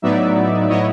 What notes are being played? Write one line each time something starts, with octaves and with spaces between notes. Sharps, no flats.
A2 F#3 B3 D#4 D5 E5
A2 F#3 B3 E4 C#5 D#5